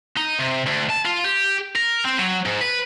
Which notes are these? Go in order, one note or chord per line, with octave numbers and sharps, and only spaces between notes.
D#4
C3
D2
A5
F4
G4
A#4
C4
F#3
G#2
B4